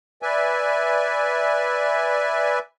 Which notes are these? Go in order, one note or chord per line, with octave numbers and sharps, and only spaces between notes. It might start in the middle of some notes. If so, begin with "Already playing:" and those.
B4 D5 E5 G#5